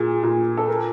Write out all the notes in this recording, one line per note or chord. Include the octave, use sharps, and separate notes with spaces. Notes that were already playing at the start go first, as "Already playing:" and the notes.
Already playing: A#2 G#4
A#2
A4
A#4